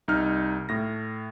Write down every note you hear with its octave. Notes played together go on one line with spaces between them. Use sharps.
C2 D#4 F6
A2 A#6